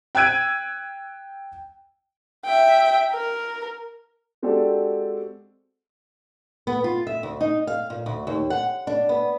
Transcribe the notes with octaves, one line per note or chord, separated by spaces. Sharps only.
G5 E6 F#6 G#6 D7 D#7
E5 G5
A#4
G#3 C4 D4 F#4 G4 A4
B3
F4
E5
D2
D#4
F5
A#2
D2
D#2
F#5
D4
B3